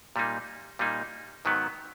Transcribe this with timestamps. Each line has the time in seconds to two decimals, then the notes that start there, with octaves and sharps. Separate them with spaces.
0.16 A#2 G3 A#3 D#4
0.79 A#2 G3 A#3 D#4
1.45 G#2 D#3 F#3 B3